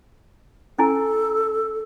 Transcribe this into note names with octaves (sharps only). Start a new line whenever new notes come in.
C#4 E4 A4 G#5